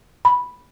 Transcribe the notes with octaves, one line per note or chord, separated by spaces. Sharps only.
B5